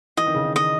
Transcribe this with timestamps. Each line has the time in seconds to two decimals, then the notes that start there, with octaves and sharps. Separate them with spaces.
0.17 E3 D#5
0.27 D#3
0.34 C#3
0.44 D#3
0.56 D#5